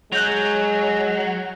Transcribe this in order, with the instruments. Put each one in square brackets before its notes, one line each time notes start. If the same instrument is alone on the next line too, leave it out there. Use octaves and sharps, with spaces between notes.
[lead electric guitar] F#3 [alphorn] G#3 [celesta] F#6 G6 F7